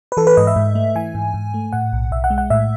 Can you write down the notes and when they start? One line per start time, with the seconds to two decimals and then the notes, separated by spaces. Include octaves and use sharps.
0.12 B4
0.17 E3 A4
0.27 B4
0.37 G#2 D#5
0.47 E5
0.56 G#2
0.75 A3
0.95 E3 G#5
1.14 G#2
1.34 G#2
1.54 A3
1.73 A2 F#5
1.93 B1
2.11 B1 E5
2.24 F#5
2.30 G#3
2.38 F#5
2.50 A2 E5